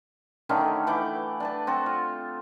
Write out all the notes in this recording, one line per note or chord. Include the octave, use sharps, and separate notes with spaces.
D3 D#3 A3 C#4
E3 F#5 G5 D6
D4 B4 A5
C4 F#4 A4
F4